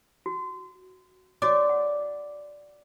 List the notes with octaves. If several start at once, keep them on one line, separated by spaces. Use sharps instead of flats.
F#4
F#4 C#5 D5 D6
F#5